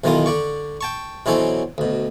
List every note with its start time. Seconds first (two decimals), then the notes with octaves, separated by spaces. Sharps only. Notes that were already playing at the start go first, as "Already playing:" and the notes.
0.04 B1 B2 D#3 E3 F4 D#6
0.26 D3 D5 C#6
0.81 G5 A5 C#6
1.26 B2 E3 F#3 C4 C#4 A4
1.78 D2 B2